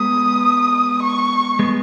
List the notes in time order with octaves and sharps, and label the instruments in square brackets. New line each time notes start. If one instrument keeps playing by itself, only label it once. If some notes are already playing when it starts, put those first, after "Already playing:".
Already playing: [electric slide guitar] G#3 B3 [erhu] D#6
[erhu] C#6
[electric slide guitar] G#3 B3